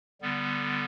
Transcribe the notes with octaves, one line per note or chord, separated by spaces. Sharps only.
D3 G3 B3